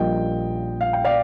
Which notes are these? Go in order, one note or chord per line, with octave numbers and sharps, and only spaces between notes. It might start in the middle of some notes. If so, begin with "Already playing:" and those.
Already playing: A#1 A#2 G3 A#3 D#5 G5
F5
G5
D5 F5